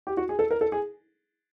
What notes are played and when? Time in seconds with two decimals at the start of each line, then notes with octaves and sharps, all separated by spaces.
0.07 G4
0.17 F#4
0.29 G#4
0.39 A4
0.51 A#4
0.61 A4
0.72 G#4